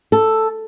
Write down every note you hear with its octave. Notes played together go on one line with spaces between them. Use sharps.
A4